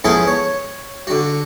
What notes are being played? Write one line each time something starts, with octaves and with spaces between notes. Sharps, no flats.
F3 B3 C#4 E4 G#4 A4
C#5
D3 F#4